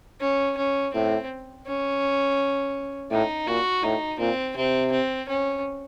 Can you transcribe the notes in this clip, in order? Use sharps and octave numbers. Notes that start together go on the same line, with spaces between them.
C#4
C#4
A2 C4
C#4
A2 D#4
A#2 F#4
A2 D#4
A#2 C4
C3 C4
C4
C#4